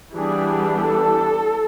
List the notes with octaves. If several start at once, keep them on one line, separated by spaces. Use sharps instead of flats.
E3 G3 B3 D4 G#4
A4